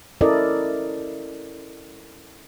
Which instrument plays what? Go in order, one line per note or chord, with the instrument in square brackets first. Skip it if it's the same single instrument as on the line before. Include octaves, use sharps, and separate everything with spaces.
[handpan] C#4 E4 A4 A#4 D5 D#5